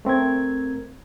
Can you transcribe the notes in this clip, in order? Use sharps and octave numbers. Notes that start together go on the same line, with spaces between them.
A3 C4 A#4 G#6